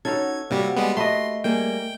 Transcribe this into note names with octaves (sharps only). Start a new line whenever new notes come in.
C#4 D#4 F#4 A4 C#5 G#6
C3 G3 A#3 F#4 G4
G3 G#3 B3
A3 B4 D#5 C6
G3 A#3 G#4 G5